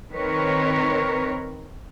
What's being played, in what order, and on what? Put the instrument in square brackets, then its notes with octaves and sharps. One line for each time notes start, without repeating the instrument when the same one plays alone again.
[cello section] D#3 C4 A#4 B4 C#5